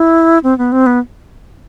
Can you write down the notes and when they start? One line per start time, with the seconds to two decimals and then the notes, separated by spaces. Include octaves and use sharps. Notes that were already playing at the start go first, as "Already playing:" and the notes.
Already playing: E4
0.43 C4
0.58 B3
0.72 C4
0.86 B3